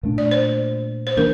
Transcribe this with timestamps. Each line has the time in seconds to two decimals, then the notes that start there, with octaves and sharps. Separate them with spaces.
0.03 A#2 A3 D4
0.18 D5
0.31 C5
1.07 C5
1.17 E3 A#3 D4 A#4